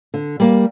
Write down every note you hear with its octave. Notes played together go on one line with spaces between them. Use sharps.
D3
G3 A#3